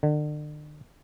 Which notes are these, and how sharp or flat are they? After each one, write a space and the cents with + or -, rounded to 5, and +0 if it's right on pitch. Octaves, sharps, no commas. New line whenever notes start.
D3 +40